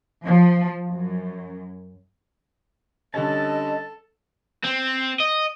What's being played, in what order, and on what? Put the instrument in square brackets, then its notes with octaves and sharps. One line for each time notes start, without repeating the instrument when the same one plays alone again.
[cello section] F3
F#2
[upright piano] D3 G3 C#4 [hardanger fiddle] A4 [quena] D#5 [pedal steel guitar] A5
[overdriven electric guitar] C4
D#5